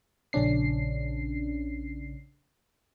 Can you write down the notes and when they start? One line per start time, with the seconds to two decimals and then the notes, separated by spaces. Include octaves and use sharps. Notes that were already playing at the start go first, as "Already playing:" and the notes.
0.33 A#1 C#3 C#4 D4 C7